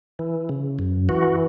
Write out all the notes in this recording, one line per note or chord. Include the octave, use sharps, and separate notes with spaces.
E3
C#3
F#2
E3 F#4